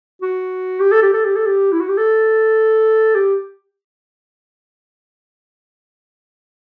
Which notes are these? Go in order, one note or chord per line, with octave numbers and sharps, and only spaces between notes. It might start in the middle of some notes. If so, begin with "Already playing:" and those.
F#4
G4
A4
G4
A4
G4
A4
G4
E4
F#4
G4
A4
G4